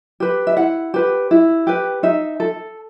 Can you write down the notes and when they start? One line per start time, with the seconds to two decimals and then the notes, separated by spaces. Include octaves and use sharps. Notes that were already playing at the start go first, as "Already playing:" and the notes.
0.20 G4 B4
0.47 E5
0.57 E4 F#5
0.94 G4 B4
1.31 E4
1.67 G4 B4
2.03 D#4 E5
2.40 A4